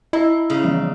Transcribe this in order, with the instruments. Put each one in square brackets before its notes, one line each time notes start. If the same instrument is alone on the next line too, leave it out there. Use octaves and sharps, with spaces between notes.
[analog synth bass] E4 [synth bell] D#5 A#5 E6
[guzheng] C#3 D#4
[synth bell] E3 F3 G3